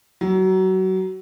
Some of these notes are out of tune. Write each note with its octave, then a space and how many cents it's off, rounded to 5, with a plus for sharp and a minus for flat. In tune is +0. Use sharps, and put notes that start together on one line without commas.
F#3 +25